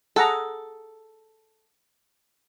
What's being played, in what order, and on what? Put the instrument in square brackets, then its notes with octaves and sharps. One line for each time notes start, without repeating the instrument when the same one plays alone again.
[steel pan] G#4 F#5 A#5 [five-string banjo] A4